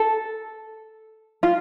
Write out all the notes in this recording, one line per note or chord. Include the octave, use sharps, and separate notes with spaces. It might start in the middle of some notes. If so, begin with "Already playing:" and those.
Already playing: A4
F4